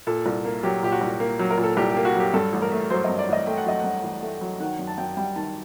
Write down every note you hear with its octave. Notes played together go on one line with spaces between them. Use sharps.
A#2 A4
C2
A#3
F#3 G4
A#2 G4
F#4
C2
A#3
F#3
A#4
A#2
A4
C2 G4
G4
A#3
F#4
F#3 G4
G2 A4
A1
A#4
A3
F#3 C5
G2 D#5
D5
A1 D#5
A3 G5
F#5
F#3 D#5
G2 F#5
A1
A3
F#3
D#3 F#5
F#2
A5
F#2 G5
G3 G5
D#3 A5